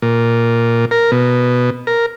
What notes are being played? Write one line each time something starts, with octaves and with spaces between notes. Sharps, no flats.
A#2
A#4
B2
A#4